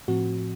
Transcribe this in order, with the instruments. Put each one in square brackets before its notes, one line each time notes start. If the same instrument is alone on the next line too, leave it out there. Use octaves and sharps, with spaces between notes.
[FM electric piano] A2 F3 C4 F#4